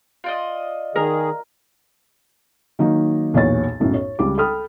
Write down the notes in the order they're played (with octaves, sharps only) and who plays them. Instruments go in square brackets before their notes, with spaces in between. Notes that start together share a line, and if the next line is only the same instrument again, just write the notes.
[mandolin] F4 D5 D#5
[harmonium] D#3 G#4 [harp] A#4
[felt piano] D#3 F#3 A#3 D#4
B1 E2 A#2 C#5 A6
B1 F#2 A2
C#5
C#2 G3 D6
A4 G5 B5 D#6 F6